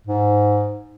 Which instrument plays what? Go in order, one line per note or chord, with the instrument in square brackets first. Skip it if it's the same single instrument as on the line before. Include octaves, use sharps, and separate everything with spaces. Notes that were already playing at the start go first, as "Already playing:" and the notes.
[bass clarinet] G#2